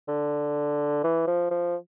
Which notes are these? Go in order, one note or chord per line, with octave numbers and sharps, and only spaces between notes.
D3
E3
F3
F3